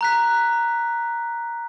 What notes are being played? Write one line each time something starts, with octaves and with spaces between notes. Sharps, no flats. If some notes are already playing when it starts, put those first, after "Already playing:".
A#5 F#6 B6